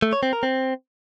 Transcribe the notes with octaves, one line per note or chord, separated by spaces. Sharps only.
A3
C#5
C4
A#4
C4